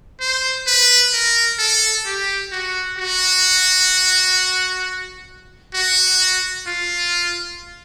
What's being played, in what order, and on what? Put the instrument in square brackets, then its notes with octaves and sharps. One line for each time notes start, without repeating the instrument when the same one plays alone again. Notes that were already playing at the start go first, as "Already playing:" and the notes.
[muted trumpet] C5
B4
A#4
A4
G4
F#4
F#4
F#4
F4